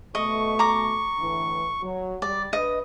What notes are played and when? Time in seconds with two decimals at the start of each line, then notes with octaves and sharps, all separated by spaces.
0.15 B2 A3 D#5 C#6
0.59 A#5 D6
1.18 A2 D3 E3
1.82 F#3
2.22 G3 D5
2.53 D4 B4 D#5